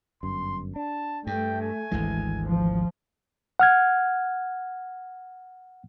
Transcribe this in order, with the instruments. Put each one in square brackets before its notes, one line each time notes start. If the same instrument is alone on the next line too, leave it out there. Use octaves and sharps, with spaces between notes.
[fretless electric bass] G1 F#2 [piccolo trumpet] C6
[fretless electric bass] D4 [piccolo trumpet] A5
[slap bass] G2 [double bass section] A3 [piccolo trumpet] G5
[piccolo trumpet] G#5
[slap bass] G#1 D2 G#3 [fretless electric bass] E3
[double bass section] F3
[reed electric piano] F#5 F6 G#6